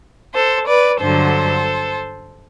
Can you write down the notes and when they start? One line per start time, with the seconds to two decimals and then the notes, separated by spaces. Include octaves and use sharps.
0.33 A4 C5
0.67 B4 D5
1.00 G2 D3 F#3 A4 C5